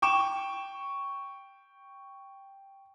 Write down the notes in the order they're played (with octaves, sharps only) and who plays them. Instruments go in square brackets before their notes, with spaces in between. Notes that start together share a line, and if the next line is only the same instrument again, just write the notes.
[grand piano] G5 C#6 E7